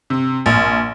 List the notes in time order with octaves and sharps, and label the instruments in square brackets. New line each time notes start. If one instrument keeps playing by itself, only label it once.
[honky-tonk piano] C3
A#1